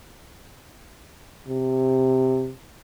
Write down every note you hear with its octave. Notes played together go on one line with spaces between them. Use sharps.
C3